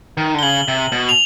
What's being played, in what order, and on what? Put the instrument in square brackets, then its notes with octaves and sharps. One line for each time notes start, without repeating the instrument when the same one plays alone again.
[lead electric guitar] D#3
D3
[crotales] G7
[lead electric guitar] C#3 [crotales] F#7
[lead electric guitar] C3
B2
[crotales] F7